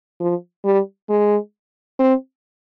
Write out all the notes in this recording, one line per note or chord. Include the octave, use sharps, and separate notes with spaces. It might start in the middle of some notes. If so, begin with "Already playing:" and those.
F3
G3
G#3
C4